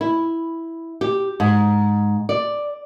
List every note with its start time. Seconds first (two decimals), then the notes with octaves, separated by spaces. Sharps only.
0.01 E4
1.01 G4
1.40 G#2
2.29 D5